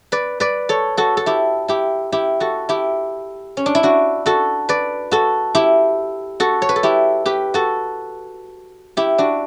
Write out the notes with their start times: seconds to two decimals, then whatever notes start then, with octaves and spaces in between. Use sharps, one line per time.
0.12 B4 D5
0.40 B4 D5
0.69 A4 C#5
0.97 F#4 A4
1.17 A4
1.26 E4 G4
1.68 E4 G4
2.12 E4 G4
2.40 F#4 A4
2.69 E4 G4
3.57 C#4
3.66 D4
3.75 E4
3.83 D4 F#4
4.26 F#4 A4
4.69 B4 D5
5.11 F#4 A4
5.55 E4 G4
6.40 F#4 A4
6.62 C#5
6.69 B4
6.76 A4
6.83 E4 G4
7.26 G4 B4
7.54 F#4 A4
8.97 E4 G4
9.18 D4 F#4